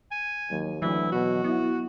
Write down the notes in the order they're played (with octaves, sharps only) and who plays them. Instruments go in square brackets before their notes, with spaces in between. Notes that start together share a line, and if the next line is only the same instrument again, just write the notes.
[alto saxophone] G#5
[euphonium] D#2 [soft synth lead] F#3
[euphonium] D2 [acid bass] E3 [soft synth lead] F#3 [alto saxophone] E4
[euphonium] B2 [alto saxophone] F#4
[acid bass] B3 [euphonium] E4